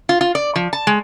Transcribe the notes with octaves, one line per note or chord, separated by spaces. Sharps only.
F4
F4
D5
F3
A5
G#3